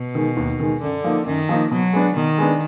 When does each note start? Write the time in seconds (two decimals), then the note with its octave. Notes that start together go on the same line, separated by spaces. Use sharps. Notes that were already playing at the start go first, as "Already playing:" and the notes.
Already playing: B2
0.15 D#3 G#3
0.37 D#2
0.60 D#3 G#3
0.82 F#2 D3
1.04 F3 A#3 D#4
1.26 F#2 D#3
1.49 F3 A#3 D#4
1.71 B2 F#3
1.93 G#3 B3 D4
2.15 B2 D#3
2.38 G#3 B3 D4